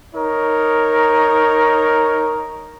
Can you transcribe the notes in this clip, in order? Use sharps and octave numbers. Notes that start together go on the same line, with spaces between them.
D#4 A#4 C#5